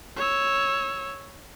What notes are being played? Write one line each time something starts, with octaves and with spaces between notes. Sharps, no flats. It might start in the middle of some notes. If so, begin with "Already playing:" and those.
C#5 E6